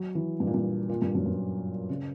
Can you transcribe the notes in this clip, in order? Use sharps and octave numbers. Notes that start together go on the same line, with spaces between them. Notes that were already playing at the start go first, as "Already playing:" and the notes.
Already playing: F#3
E3
G2
A#2
G2
A#2
G2
F#2
G2
C#3